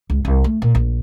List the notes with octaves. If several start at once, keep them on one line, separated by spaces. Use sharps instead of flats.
C#2
C2
A3
A#2
A#1